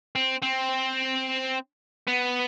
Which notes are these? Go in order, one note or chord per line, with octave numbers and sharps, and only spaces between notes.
C4
C4
B3